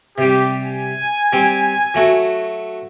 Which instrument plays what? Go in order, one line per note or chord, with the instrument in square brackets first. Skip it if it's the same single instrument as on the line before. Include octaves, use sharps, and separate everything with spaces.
[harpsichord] C3 G3 [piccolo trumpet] G4
[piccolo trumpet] G#5
[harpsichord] G3 C4
F#3 A3 F#4